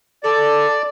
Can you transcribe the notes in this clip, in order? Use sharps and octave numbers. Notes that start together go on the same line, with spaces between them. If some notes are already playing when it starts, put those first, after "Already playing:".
A4 D5